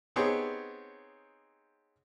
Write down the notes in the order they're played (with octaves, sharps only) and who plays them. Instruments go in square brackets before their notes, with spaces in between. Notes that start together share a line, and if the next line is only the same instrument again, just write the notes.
[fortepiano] B3 C4 D#4 G4 G#4 C#5